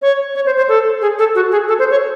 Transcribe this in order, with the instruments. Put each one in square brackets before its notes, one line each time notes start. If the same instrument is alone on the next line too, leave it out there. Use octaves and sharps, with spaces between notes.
[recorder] C#5
C#5
C5
C5
A4
G#4
A4
F#4
G#4
A4
C5
C#5